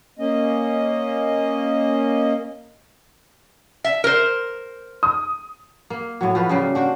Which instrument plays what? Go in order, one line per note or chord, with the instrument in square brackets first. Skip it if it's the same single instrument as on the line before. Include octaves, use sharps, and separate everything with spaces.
[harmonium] A#3 C#4 D#5
[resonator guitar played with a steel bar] E5
A#4 C5
[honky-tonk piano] D#6
[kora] A#3
A2 F#3
F3 F#4 B4
C#3 F#3 G3 A#3
D4 F#4 C5